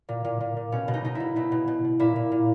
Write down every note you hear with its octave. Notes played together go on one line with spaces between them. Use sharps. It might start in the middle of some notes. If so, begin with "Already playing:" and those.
A#2
A#2
A#2
A#2
B2 C#4
B2
D#4
B2 D#4
E4
B2
B2 E4
B2
B2
B2
A#2 E4
A#2
A#2